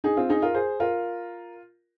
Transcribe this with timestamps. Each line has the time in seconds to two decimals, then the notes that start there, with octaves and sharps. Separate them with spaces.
0.04 D#4 G#4
0.17 C4 F4
0.29 D#4 G#4
0.42 F4 A#4
0.54 G#4 C5
0.80 F4 A#4